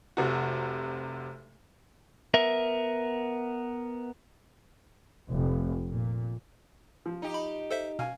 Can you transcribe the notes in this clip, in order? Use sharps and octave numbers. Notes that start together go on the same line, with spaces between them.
F1 C3 F#4
B3 A#4 E5
F1
A#2
F3
D#4 G4
B5
A4 C5 E5
B2 F5 G#5